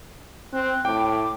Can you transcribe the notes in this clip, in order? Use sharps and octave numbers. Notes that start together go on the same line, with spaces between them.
C4 F#6
A2 G5 D6